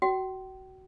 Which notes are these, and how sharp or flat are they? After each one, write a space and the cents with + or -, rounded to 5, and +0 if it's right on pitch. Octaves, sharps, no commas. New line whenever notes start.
F#4 +15 G5 -35